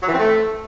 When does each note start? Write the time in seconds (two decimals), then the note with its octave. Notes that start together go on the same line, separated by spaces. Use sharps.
0.03 F#3
0.08 E3
0.14 C4
0.20 A3